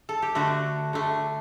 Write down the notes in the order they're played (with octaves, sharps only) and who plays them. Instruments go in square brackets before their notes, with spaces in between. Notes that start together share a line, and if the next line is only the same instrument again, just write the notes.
[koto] A4
G4
D3 A3 F#4
D3 A3